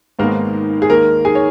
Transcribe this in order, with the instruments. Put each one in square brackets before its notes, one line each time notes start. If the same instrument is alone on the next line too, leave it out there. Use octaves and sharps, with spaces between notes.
[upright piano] G#1 G#2 D#3 G#3 A#3 B3 A#4
G#4
D#2 D#3 G#3 A#3 A#4
G#4 G#5
C#5